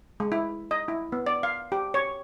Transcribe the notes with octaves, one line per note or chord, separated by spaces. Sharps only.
G#3
E4
D#5
E4
B3
D5
F5
G4
C#5